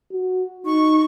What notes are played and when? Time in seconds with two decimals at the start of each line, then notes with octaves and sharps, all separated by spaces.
0.12 F#4
0.66 D#4 C#6